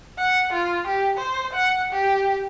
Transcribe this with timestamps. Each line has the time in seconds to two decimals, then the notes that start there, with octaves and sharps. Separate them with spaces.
0.18 F#5
0.53 F4
0.87 G4
1.17 C5
1.53 F#5
1.93 G4